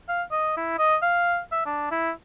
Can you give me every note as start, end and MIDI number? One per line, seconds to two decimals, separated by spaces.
0.09 0.23 77
0.31 0.54 75
0.57 0.76 64
0.79 0.96 75
1.02 1.39 77
1.52 1.61 76
1.66 1.87 62
1.91 2.11 64